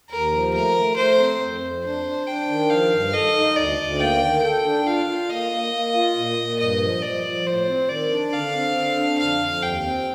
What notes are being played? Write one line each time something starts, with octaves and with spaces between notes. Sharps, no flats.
D#2 A#4
F3
A3 A#4
A3
A3 C5
C4
F2
F2
D4 C5
D4
D4 G5
D#3
F3 F5
G2
A4 D#5
D#4
D2 D5
D2
A#3 G5
D#3
A4 G5
D4
F4 F5
F4
A#3 D#5
A#3
A#3
F4
A#2
A#2
G2 D#5
F3
F3 D5
F3
A2 C5
C4
D#3 D5
D4
D3 F5
C4
D3
D4
F2 F5
F2
D#2 G5
C4